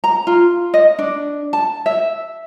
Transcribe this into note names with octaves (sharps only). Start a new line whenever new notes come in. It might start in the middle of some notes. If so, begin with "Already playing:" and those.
A#5
F4
D#5
D4
A5
E5